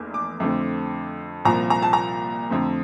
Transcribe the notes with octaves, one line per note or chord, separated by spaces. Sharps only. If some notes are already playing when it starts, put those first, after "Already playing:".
Already playing: F1 E2 A#3
D6
F2 D3 A3 C4
C2 A#2 F3 A#5
A#5
A5
A#5
F2 D3 A3 C4